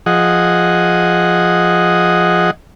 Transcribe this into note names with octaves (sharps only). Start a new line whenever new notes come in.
F3 G#4 D#5 F#5